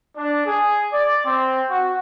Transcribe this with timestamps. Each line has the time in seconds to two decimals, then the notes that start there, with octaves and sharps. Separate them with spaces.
0.15 D4
0.46 G#4
0.93 D5
1.25 C4
1.70 F#4